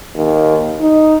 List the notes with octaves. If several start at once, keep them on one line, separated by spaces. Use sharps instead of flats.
D#2
D#4